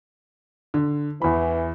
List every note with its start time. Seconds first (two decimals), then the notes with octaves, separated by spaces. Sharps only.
0.74 D3
1.22 E2 E3 B5